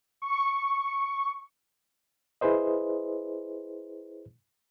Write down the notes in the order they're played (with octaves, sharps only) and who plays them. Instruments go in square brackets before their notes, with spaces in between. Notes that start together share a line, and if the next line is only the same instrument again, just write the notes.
[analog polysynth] C#6
[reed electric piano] E4 G#4 B4 C5 D#5